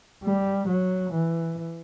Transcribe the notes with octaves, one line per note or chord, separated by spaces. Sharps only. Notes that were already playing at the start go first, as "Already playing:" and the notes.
G3
F#3
E3